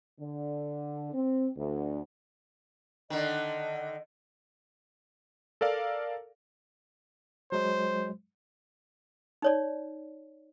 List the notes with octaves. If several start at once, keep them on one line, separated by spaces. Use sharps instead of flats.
D3
C4
D2
D3 D#3 D#5
A4 A#4 D5 F5
F#3 G#3 C5
D#4 C#5 D5